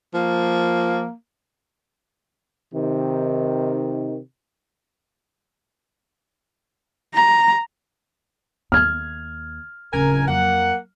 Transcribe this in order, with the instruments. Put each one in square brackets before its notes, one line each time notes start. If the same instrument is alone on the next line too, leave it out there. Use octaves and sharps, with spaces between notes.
[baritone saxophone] F3 [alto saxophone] A#3
[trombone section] C3 D#3
[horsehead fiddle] A#5
[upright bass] D#2 [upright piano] F6 G#6
[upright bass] D1 C#3 [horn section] A#4 G#5
[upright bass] F2 F#3 [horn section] A#3 F#5